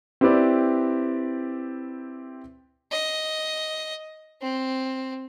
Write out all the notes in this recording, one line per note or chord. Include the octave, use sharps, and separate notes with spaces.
C4 E4 G4 B4 D5
D#5
C4